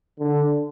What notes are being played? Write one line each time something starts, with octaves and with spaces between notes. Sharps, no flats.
D3